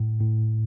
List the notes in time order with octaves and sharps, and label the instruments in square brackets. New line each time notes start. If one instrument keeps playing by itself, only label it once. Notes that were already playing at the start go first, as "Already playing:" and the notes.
Already playing: [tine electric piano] A2
A2